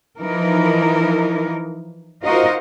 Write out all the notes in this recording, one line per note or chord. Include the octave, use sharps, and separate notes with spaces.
E3 F3 D#4 A#4
D#4 F4 F#4 A#4 C5 D#5